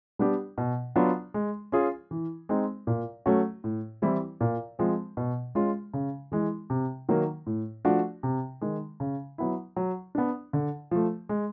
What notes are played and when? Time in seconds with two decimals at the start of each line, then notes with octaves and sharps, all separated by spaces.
0.19 G3 B3 D4 G4
0.58 B2
0.96 F#3 B3 D4 F4
1.34 G#3
1.72 C#4 F4 G#4
2.11 E3
2.49 G#3 C4 D#4
2.87 A#2
3.26 F#3 A3 C#4 F#4
3.64 A2
4.02 E3 G3 C4 E4
4.41 A#2
4.79 F3 G#3 C4
5.17 B2
5.55 G#3 C#4 F4
5.94 C#3
6.32 E3 G#3
6.70 C3
7.09 D#3 F#3 A#3
7.46 A2
7.85 F3 A3 D4 F#4
8.23 C3
8.61 D#3 G#3
9.00 C#3
9.38 F#3 B3 E4
9.77 F#3
10.15 B3 D4
10.53 D3
10.91 F3 A3
11.29 G#3